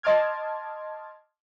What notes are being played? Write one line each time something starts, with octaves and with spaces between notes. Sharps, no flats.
D#5 A5 C6 D6 F6 G#6